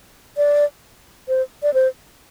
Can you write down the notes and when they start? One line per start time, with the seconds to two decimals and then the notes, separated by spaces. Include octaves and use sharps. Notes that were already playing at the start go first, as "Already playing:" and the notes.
0.37 D5
1.28 C5
1.63 D5
1.74 C5